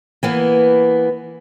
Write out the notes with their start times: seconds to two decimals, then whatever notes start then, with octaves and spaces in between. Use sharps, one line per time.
0.23 E3 A#3 B3